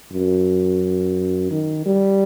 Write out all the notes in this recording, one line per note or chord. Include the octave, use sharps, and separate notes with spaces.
F#2
D#3
G3